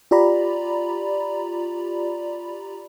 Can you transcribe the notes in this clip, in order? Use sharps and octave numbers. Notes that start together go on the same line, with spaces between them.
F4 G4 D5 A#5 B5